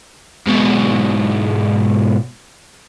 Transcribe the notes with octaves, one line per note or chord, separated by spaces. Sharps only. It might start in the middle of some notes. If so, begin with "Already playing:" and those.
G#2 B2